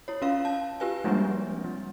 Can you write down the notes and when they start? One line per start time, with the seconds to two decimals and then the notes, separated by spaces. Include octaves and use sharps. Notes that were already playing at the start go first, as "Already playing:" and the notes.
0.08 E4 C#5
0.22 C#4 F4 F5
0.45 A5
0.80 F4 G4 B4 G#5
1.04 F3 G3 G#3 A#3 C4 D4
1.64 G3